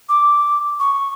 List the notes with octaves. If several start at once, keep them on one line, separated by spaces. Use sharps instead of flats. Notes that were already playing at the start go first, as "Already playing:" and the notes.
D6
C#6